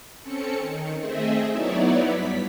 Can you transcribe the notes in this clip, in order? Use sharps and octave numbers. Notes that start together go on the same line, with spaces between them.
C4 C#4 A4 C#7
D#3
A3 C4 G#4 D#5 E5
F#3 B3 D#4 E4 C#5 D5
G2 B6